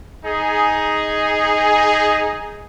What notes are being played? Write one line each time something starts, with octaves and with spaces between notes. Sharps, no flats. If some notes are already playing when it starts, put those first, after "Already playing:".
D#4 G#4